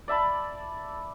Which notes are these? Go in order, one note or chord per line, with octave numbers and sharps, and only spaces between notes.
D5 E5 A5 B5